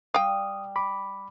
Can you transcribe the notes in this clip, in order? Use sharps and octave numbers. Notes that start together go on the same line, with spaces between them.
G3 F5 G5 D#6
B5 D6